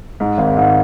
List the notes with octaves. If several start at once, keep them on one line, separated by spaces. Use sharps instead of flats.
G#2
G#1
G#2